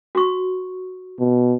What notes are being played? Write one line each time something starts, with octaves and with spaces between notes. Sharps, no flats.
F#4 C#6
B2